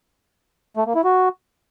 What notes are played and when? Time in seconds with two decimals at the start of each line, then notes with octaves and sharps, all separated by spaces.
0.77 A3
0.86 A#3
0.95 E4
1.04 F#4